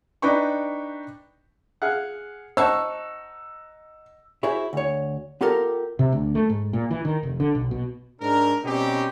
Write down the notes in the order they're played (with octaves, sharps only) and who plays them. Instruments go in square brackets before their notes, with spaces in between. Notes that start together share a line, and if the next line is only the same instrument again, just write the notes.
[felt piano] D4 D#4 B4 G5 B5 C#6
[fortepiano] G#4 F5 F#5
[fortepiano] D#4 F#5 [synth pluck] C5 A5 C#6 [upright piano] E6
[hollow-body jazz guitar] E4 F#4 G#4 C5 E5
D2 C#5
B3 F4 G4 A4 A#4
[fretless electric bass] C3
D2
A3
G#2
A#2
E3
D#3
F1
D3
B1
B2
[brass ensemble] G#2 D4 A#4
B2 G3 C4 C#4 D#4 G4